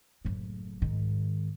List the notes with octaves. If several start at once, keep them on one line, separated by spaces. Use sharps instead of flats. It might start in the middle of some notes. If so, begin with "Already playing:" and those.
F#1 A2
G#2 D#3